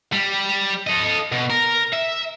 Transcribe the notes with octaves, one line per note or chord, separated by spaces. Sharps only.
G3
A4 D#5
B2
A#4
E5